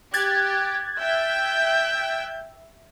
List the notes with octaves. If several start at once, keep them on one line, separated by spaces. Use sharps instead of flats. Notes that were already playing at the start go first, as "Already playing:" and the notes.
G4 F#6 G#6 A6
E5 G5 G6